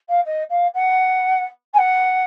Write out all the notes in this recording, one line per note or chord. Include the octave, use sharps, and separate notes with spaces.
F5
D#5
F5
F#5
G#5
F#5